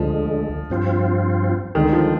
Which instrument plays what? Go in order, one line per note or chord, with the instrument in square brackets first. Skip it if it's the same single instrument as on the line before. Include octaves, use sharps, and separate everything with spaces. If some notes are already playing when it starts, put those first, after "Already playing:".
Already playing: [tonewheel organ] D2 D3 G#3 [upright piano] F3
[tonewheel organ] G2 F3 C4 F4
[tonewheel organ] D2 D3 G#3 C4 [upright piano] D#3
[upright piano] F3